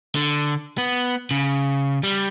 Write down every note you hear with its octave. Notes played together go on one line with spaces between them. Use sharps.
D3
B3
C#3
G3